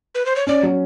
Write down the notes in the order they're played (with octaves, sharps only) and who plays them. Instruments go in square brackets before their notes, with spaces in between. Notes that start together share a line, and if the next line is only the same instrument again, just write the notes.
[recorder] B4
C5
C#5
[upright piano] C#4 [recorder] D5
[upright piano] F#3